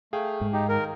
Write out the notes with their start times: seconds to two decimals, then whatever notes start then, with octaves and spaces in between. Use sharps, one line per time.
0.13 A3 G#4 F5 G5
0.41 G#2
0.53 D#4 G4
0.69 D#3 A#4